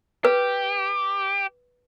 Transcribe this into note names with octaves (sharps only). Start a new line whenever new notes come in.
G4 B4